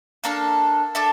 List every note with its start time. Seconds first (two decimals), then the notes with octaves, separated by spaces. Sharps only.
0.24 A#3 D4 A4 F5
0.95 D4 A4 E5